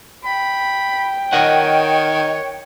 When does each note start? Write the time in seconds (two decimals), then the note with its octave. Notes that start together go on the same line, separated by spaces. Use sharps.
0.25 G5 B5
1.33 D#3 A#4 C#5 D#5 F#5